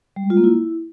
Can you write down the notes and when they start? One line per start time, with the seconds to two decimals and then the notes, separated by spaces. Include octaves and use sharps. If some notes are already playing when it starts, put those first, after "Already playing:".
0.16 G3
0.23 G#3
0.30 F4
0.37 A#3
0.44 E4